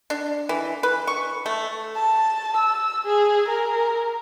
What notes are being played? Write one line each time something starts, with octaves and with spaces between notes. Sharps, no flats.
D4
E3
B4
C#6
A3
A5
E6
G#4
A#4